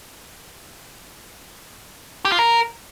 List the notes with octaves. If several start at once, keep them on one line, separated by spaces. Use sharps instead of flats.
G4
F4
A#4